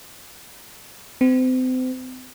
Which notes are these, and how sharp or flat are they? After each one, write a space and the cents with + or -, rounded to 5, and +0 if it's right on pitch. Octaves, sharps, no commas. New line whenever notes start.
C4 -35